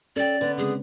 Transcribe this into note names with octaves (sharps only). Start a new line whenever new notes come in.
C#4 A4 D5 G5
D3 B3 B4
C#3 G#3 C4 G#4